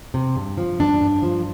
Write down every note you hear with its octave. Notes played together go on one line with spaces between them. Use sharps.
C3
G2
F3
G2 D4
G2
F3